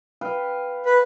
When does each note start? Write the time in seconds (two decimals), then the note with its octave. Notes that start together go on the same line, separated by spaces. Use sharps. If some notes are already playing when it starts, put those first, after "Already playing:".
0.21 B4 F5 G5
0.85 B4